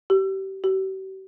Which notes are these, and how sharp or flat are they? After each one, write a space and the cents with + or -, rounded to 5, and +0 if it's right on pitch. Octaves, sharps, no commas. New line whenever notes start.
G4 -30
G4 -45